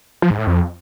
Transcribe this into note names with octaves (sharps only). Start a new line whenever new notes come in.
F3
G#2
A2
F2